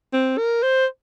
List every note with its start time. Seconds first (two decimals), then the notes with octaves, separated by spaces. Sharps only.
0.13 C4
0.38 A#4
0.63 C5